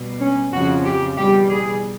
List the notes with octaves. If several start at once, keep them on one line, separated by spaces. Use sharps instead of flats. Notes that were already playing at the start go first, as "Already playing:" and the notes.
Already playing: B2 G3
C#4
F2 C#3 F3 F#4
G4
E2 B2 G3 G4
G#4